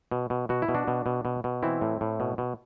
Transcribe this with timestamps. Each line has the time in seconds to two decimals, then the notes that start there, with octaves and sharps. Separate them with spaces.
0.12 B2
0.30 B2
0.49 B2 F#4
0.62 E4
0.69 B2
0.74 D4 F#4
0.87 B2
1.06 B2
1.25 B2
1.44 B2
1.63 E3 C4 E4
1.81 A2
2.01 A2
2.20 B2
2.38 B2